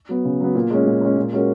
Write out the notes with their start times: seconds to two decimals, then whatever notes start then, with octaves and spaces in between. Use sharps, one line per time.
0.09 F#3 B3
0.25 C#3
0.40 F#3 B3
0.55 A#2
0.70 G#3 C#4
0.86 A#2
1.01 G#3 C#4
1.17 A#2
1.33 G#3 C#4 F#4 A#4